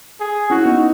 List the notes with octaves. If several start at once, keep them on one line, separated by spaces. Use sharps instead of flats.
G#4
C#4 E4 F#4
B3 D#4